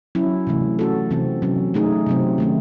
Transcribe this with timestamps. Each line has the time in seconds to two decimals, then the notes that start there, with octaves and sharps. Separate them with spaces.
0.15 F#3 C#4 E4
0.47 C3 E3 A3
0.79 A3 C#4 F#4 A4
1.11 C3 E3 C4
1.42 C3 F#3 C#4
1.74 A3 D#4 G#4
2.07 C3 F#3 C4
2.38 D#3 A3 C#4